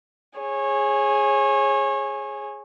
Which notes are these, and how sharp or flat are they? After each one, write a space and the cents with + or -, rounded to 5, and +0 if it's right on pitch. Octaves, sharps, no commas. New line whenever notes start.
G#4 +0 C#5 -25